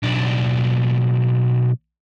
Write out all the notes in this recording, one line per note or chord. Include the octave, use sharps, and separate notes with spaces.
B1 D4